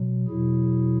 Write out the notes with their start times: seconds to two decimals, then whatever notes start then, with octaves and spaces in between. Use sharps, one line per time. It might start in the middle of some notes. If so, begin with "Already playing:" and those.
Already playing: B2 F#3
0.28 E2 B2 F#3 E4 G#4